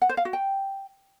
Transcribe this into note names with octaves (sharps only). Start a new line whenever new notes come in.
F#5
C5
F5
F#4
G5